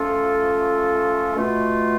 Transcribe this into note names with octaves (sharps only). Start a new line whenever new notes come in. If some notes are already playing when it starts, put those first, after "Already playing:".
Already playing: F3 A3 C#4 F4 A4
B2 A3 F4